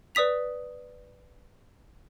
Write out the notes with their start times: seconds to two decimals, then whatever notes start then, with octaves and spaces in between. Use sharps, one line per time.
0.15 B4 D5 D#6 B6 F7